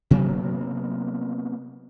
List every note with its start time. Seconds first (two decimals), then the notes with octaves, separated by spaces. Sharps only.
0.11 C3 F#3 A#3 B3